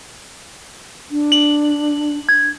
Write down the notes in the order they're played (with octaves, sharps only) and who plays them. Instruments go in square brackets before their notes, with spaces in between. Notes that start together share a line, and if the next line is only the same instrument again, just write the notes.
[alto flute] D4
[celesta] F#7
G#6